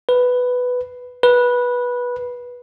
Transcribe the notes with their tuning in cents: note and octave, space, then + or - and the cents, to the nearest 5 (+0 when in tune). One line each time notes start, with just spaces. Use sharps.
B4 +5
B4 -15